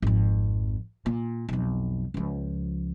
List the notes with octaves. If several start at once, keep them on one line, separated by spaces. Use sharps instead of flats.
G#1 F2
A#2
B1 F2
C#2 F3